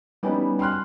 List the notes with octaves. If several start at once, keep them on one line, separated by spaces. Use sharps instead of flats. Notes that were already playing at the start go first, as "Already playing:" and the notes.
G3 B3 C#4 D#4 E4 G4
G5 C6 F6 F#6